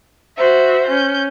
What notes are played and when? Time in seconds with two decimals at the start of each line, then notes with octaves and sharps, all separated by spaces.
0.37 F#4 C5 E5
0.87 C#4 G6